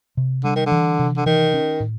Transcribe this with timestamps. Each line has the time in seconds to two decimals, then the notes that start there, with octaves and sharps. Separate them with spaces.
0.17 C3
0.44 D3 G3
0.55 D#3
0.66 D3
0.72 E3
0.99 C3
1.17 D3
1.26 D#3 E3
1.54 C#4
1.80 A2